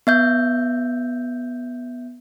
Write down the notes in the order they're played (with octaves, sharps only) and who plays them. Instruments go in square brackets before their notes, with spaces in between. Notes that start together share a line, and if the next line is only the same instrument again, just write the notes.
[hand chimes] B3 E5 G6